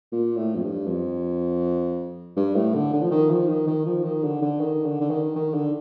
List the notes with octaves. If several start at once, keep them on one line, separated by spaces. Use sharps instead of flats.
A#2
A2
F2
G2
F2
G2
A2
D3
D3
F3
D#3
F3
D#3
D#3
F3
D#3
D3
D3
D#3
D3
D3
D#3
D#3
D3